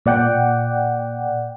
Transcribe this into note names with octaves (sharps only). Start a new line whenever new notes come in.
A#2 D5 F#5 G5